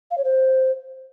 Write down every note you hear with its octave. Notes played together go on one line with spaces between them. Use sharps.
F5
C#5
C5